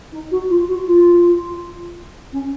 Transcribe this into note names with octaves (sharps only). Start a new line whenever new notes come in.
D#4
F#4
F4
F#4
F4
C#4